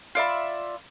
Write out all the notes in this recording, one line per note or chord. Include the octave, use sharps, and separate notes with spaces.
F4 D5 E5 B5